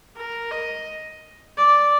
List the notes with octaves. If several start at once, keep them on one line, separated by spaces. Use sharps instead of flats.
A#4
D#5
D5